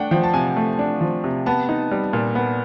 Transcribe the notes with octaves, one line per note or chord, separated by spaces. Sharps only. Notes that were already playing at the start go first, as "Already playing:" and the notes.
Already playing: A3 D4 F#5 G5
F3 G5
A5
C3 G#5
A3
D4
F3
C3
B3 A5
D#4
G3
A#2
B3